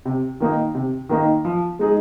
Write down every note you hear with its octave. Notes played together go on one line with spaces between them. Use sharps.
C3
D#3 A#3 D#4
C3
D#3 A#3 D#4
F3
G#3 D#4 G#4